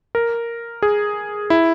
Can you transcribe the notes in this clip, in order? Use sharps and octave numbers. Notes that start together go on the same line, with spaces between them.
A#4
G#4
E4